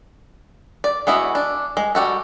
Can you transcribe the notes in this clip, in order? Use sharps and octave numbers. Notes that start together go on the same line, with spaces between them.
D5
G#3 B3 E4 F#4
D4
G#3
G3 F#4 A4